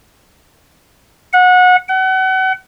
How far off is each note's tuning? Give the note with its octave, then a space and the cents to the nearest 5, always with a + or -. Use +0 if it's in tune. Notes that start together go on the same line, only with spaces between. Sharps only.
F#5 -25
F#5 +35